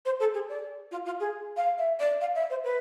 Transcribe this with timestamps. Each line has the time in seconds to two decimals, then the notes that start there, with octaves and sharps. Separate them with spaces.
0.05 C5
0.20 A4
0.34 G#4
0.49 D5
0.91 F4
1.05 F4
1.20 G#4
1.57 F5
1.78 E5
1.99 D5
2.21 F5
2.35 E5
2.50 C5
2.64 B4